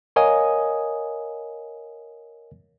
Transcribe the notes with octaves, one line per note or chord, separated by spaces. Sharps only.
A#4 C#5 D#5 F5 G#5 D#6